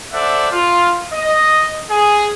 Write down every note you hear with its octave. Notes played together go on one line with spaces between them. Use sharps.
A4 C5 D5 E5 F#5
F4
D#5
G#4